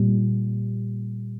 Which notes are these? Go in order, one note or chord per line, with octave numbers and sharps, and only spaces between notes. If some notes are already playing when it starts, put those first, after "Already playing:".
Already playing: A#2 G3